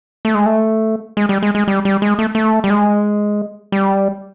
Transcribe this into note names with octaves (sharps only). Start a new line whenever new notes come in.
A3
G#3
A3
G#3
G3
G#3
G#3
G3
G3
G#3
A3
A3
G3
G#3
G3